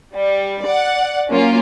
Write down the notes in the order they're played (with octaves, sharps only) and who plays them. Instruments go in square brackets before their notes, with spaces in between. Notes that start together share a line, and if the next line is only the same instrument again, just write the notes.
[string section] G3
D5 F#5
F#3 A#3 C#4 F4